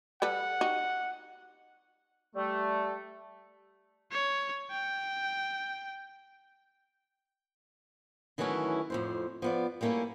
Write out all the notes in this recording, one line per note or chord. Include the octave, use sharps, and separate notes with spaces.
G3 A4 B4 F#5
D#4 F#4 G4
G3 A3
C#5
G5
D#3 E3 F#3 A3 C#4 E4
F2 A2 C5
F3 B3 D5
G3 A3 A#3 C4 C#4 E4